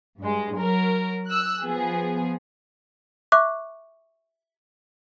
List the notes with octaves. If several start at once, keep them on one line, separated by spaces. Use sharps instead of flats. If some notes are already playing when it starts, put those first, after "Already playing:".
G2 G#3
F#3 A#4
E6 F#6
F3 B3 G#4
E5 C#6 D6 F#6